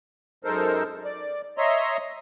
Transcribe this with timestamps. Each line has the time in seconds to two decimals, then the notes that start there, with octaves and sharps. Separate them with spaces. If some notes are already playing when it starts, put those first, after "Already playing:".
0.44 F#2 G#3 D#4 A4 A#4 C5
1.05 D5
1.58 C#5 D#5 E5 A#5 C6